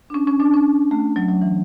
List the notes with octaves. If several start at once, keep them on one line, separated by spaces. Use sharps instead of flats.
D4
C#4
C#4
D4
C#4
A3
F#3
F#3
E3